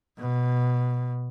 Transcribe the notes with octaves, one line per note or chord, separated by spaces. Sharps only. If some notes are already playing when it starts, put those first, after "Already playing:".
B2